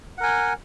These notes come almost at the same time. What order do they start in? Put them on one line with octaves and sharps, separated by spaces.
F#5 A#4 G#5